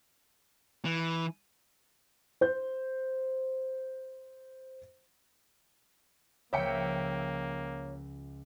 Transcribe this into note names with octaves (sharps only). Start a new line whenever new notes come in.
E3
C5 G6
C#2 F3 A#3 C#5 E5 G5 C#7